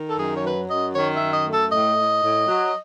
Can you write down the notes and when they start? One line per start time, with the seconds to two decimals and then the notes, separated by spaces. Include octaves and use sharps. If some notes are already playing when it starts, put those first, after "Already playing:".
Already playing: D#3
0.10 A4
0.17 F#2 G#4
0.36 C#5
0.43 F#3 B4
0.68 F#2 D#5
0.93 D#3 C#5
1.13 E5
1.19 F#2
1.32 D#5
1.45 A3
1.52 A4
1.70 A2 D#5
1.96 A2
2.22 A2
2.47 F#3